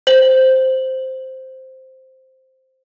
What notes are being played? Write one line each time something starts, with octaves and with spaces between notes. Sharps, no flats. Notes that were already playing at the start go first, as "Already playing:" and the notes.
C5 F#7